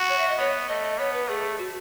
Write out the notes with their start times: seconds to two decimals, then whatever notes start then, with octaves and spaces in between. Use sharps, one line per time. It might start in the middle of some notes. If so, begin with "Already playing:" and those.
Already playing: F#4
0.09 C#5
0.18 E5
0.28 D#5
0.38 B3 C#5
0.68 A3 D#5
0.83 D#5
0.98 B3 C#5
1.13 B4
1.28 A3 G#4
1.58 F#4